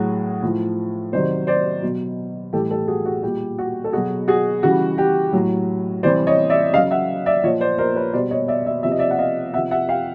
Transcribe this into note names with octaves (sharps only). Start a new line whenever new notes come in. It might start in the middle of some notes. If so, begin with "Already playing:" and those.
Already playing: A2 F#3 F#4 G#4
A2 F3
C3 D#3 F#3 C5 D5
C5 D5
B2 F#3
A2 E3 G3 G4 A4
G4 A4
F#4 G#4
F#4 G#4
A#2 G3 G4
F#4
A4
B2 F#3 F#4 G#4
F#4 G#4
C#3 E3 G3 F#4
G4
A2 F#3
C3 E3 G3 C5 D5
C#5 D#5
D5 E5
C#3 F#3 D#5 F5
E5 F#5
D5 E5
A#2 F3 C#5 D#5
C5 D5
A#4 C5
B4 C#5
B2 G3 C5 D5
C#5 D#5
D5 E5
D5 E5
C3 F3 E5
D#5
D5 E5
F#5
D#5 F5
C3 F3 E5 F#5
E5 F#5
F5 G5